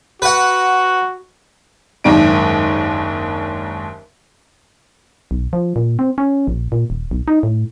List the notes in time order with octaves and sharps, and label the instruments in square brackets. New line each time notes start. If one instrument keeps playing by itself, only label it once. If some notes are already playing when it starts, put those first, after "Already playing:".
[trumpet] F#4 [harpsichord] B4 F#5
[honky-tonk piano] F#1 D#2 G#2 D4 D7
[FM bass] B1
F3
A#2
C4
C#4
A#1
A#2
D#1
B1
D#4
A2